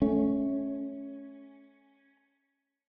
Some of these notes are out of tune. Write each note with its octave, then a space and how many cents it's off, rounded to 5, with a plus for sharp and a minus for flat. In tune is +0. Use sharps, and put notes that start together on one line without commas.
A3 -20 C#4 +0